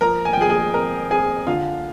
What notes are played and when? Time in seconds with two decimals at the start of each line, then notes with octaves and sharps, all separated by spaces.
0.01 F3 A#4 A#5
0.25 G#5
0.33 G5
0.37 F3 G#4 G#5
0.49 G#4 G#5
0.74 C4 A#4 A#5
1.10 C4 G#4 G#5
1.47 D3 F4 F5